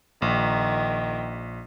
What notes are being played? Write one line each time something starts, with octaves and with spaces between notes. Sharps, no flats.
A#1 D#3